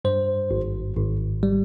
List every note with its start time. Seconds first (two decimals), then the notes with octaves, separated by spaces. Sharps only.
0.05 G2 C5
0.51 G#1
0.97 G#1
1.43 G3